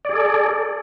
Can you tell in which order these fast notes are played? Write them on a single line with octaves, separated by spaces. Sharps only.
D5 G#4 A4